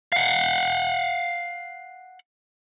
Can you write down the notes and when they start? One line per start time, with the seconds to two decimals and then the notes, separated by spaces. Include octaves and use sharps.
0.12 F5 F#5